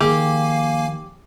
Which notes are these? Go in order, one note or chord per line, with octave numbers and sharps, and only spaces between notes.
D#3 F3 A#3 G4 G#4 F5 G#5